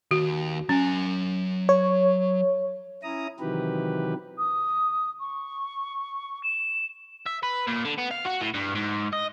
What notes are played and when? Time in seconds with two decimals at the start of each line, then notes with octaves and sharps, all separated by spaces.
0.11 D#2 F#4
0.69 F#3 C#4 G#5
1.69 C#5
3.03 C#4 E4 A#5 D#6
3.40 C3 D#3 E3 F#3 G4 B4
4.38 D#6
5.20 C#6
6.43 E7
7.26 E5
7.43 B4
7.67 A#2
7.85 D3
7.98 B3
8.11 F5
8.25 F#4
8.41 A2
8.54 G2
8.75 G#2
9.13 D#5